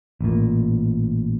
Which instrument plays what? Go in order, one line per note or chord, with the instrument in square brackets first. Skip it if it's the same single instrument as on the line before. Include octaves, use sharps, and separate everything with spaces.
[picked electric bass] A1 A#2